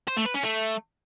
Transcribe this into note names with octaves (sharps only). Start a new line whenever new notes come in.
C5
A3
B4
C#4
A3